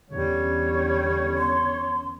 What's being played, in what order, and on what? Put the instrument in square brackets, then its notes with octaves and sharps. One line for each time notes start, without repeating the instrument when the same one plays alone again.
[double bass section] E2 D3 C#4 [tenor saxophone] G3 [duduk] C#5
[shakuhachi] C6